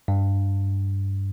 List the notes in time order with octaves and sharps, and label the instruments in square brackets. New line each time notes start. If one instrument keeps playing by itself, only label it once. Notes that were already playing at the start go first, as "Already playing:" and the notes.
[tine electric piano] G2